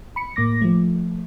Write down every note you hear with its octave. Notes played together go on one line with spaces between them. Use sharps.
B5 C#7
A2 A#3 D6 A#6
F3 A3